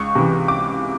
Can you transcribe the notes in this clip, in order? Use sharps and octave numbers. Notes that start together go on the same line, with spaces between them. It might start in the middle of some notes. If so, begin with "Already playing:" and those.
Already playing: C#2 C#6
C3 E3
D6